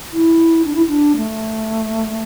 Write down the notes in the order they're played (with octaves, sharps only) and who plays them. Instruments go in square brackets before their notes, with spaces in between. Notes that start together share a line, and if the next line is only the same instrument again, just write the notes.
[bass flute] E4
D4
E4
D4
A3